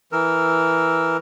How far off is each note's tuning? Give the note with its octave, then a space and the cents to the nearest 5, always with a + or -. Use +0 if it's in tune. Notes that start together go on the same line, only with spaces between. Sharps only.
E3 +0 A#4 +0 E6 +0